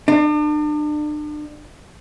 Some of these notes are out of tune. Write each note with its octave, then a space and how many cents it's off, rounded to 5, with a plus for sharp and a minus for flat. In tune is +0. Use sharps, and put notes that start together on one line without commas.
D4 +40